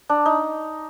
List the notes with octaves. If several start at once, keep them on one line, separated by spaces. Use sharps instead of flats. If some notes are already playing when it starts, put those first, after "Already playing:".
D4
D#4